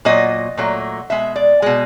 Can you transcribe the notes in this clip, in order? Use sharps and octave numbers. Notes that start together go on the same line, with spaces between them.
A#2 F#3 D#5
A#2 F#3 A3
B2 G#3 E5
D5
B2 G#3